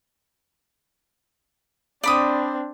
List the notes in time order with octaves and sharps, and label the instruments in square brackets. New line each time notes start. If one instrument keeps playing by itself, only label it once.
[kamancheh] C4 D4 [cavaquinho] D5 B5 D#6